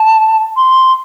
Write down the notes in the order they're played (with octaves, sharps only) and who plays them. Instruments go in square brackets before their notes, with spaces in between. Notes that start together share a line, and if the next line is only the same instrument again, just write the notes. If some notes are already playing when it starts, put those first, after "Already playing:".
Already playing: [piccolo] A5
C6